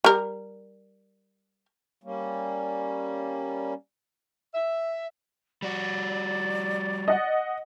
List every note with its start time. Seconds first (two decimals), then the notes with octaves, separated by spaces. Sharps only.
0.04 G3 A#4
2.03 G3 A#3 C#4
4.54 E5
5.62 G3 F#4 D5
7.08 D#5 F#5